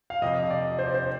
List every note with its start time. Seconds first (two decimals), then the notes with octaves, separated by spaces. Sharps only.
0.10 F5
0.22 F2 C3 F3 D#5
0.50 D5
0.79 C5
0.86 D5
0.94 C5